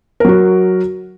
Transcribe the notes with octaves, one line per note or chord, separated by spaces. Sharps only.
F#3 F#4 A#4